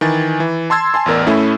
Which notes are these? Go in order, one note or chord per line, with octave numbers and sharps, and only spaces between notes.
D#3 E3 G#5 A6
E3
A5 C6 E6 G#6 A6
G#5 A5 C6
A1 E2 A#4 D5
A2 A3 C#4 E4